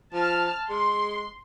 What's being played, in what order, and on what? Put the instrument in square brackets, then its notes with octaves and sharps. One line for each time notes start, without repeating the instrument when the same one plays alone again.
[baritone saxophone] F3 [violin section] A5 F6
[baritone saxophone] G#3 [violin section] C6